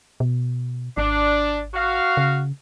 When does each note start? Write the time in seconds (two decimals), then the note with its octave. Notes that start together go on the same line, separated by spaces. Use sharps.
0.20 B2
0.97 G#1 D4
1.74 F#4 F5
2.17 C#3